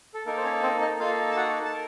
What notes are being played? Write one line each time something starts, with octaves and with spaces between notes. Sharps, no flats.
A4
A#3 D#4 A4 A#4
C5
C#4 C#5
C4 C5
D#4 D#5
A#3 D#4 F4 A4 F5
A5
F#4 F#5
A5
A#4